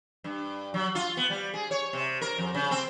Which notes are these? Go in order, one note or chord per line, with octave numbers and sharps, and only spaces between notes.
G2
F#3
F4
B3
G3
G#4
C#5
C3
A#4
F2
C#3
C4